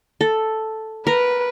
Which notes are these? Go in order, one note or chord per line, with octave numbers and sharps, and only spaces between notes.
A4
A#4 B4